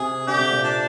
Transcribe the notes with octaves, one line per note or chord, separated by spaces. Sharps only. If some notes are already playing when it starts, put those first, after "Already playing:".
Already playing: C3 G#4
D3 G4
C3
A#2
D4